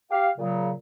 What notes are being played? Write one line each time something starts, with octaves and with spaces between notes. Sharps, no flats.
G4 F5
A#2 C#3 F#3